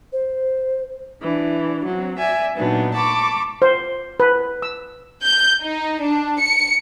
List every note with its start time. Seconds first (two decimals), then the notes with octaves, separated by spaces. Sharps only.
0.13 C5
1.22 E3 D4
1.86 F#3 C4
2.18 D5 E5 G#5
2.56 A#2 F#3 B3 D4 D#4
2.94 A5 B5 C#6 D6
3.62 C5
4.20 B4
4.62 E6
5.24 G6
5.63 D#4
6.02 D4
6.40 C#7